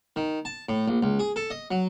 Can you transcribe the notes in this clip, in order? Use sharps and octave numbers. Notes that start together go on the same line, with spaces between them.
D#3
A5
A2
A#1
C#2
G#4
A4
D#5
F#3